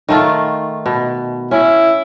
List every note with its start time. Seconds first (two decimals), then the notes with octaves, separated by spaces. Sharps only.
0.09 D#3 A3 F4
0.86 B2
1.51 C#4 E4